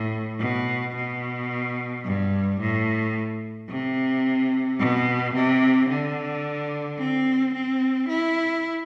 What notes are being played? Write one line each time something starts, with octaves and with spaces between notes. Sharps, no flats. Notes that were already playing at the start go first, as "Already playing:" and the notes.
Already playing: A2
B2
B2
G2
A2
C3
B2
C3
D3
C4
C4
E4